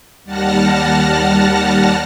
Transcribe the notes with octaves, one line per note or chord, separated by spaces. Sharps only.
D#2 G3 F#5 A5 F6 A#6